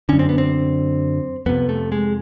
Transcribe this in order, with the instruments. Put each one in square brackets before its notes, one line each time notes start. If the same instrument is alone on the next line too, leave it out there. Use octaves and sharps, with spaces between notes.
[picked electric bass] F#2 D3 C#4
C4
B3
C4
F2 C3 B3
A3
G#3